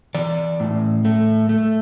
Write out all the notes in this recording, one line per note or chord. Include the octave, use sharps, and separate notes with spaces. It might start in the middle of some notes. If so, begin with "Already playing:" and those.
E3 D5
A2
A3
A3